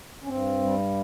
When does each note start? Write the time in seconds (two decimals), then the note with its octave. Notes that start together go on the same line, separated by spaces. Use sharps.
0.24 C#4
0.27 G2 C4
0.62 G3